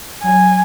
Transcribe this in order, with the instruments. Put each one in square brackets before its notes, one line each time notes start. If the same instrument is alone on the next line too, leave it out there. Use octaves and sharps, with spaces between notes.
[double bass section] F#3 [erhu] G#5